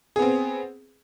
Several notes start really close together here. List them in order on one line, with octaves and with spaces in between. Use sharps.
G#4 B3 C4